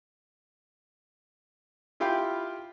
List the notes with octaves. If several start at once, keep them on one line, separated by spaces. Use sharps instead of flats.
E4 F4 G4 F5 G5 B5